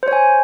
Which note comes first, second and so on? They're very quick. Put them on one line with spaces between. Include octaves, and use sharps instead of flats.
C5 C#5 G#5